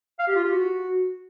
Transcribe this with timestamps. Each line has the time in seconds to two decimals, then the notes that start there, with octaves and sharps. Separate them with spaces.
0.19 F5
0.28 G4
0.36 F4
0.44 G4
0.52 F#4